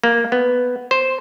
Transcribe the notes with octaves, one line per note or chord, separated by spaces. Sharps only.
A#3
B3
C5